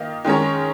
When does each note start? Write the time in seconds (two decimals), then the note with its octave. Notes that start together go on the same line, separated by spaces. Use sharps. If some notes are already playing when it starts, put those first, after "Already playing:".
Already playing: D#3 A#3 F4 D#5
0.24 D#3 G#3 C#4 A#4 C#5